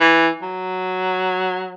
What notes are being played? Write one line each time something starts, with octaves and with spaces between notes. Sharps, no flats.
E3
F#3